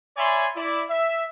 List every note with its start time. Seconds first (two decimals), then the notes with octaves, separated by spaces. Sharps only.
0.17 C#5 D5 E5 G#5 B5 C6
0.56 E4 D5
0.89 E5